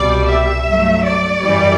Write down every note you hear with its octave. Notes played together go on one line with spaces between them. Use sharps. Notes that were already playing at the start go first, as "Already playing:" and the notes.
Already playing: C2 B2 G3 D5
E5
G2 F#3 A3
D5
F#2 E3 G3